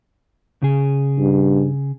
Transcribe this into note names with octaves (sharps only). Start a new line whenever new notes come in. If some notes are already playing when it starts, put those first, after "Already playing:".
C#3 G#4
G2